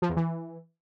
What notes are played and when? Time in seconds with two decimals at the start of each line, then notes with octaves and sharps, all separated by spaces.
0.02 F3
0.09 E2
0.16 E3